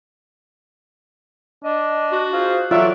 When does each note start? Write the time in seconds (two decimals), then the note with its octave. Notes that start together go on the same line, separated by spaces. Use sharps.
1.64 D4 D#5
2.12 F#4
2.33 F4 G#4 C5
2.71 E3 F#3 F4 A4 D5 E5